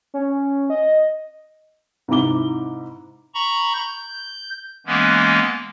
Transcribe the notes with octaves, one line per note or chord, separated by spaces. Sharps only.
C#4
D#5
G#2 C3 E4 A#5 D6 G7
A#5 B5 C#6
G6
E3 G#3 A#3 B3 C#4